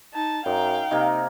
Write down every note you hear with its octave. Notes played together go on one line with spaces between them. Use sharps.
D#4 A5
F#2 D#4 F5 G5
C3 A#3 D#4 A#4